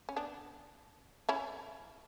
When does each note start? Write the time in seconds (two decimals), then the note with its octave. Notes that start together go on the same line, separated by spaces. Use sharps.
0.09 C#4
0.16 B3 D4
1.29 C#4 E4